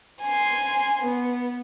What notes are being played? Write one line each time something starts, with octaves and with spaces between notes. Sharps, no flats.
G#5 C6
B3